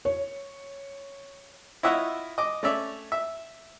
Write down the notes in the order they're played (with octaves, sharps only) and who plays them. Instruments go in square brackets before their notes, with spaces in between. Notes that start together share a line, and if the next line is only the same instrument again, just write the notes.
[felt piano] C#5
[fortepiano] E4 F4 C#5 D#5 E5 F#5
D#5 D6
A3 C#4 D5 E5
E5